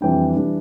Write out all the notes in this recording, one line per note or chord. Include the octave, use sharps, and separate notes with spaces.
F2 E3 G3 D4 G5
E3 G3 D4